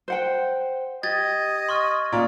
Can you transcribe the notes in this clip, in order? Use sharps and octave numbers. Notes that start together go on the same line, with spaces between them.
C5 F#5 G5
G4 D#5 G#6 A6
C6 C#6 F6
A#2